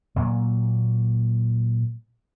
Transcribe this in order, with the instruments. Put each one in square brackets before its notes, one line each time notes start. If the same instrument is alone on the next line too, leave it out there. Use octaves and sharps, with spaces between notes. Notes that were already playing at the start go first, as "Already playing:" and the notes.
[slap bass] A#2 F#3 A#3